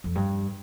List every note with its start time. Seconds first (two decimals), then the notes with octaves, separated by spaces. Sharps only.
0.04 F2
0.15 G2